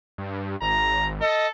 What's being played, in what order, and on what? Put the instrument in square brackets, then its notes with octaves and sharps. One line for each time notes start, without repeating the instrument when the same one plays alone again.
[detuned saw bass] G2
[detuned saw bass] G#1 [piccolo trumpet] A#5
[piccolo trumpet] A4 [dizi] D#5